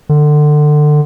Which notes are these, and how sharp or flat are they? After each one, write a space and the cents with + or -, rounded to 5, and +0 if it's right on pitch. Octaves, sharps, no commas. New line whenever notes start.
D3 +25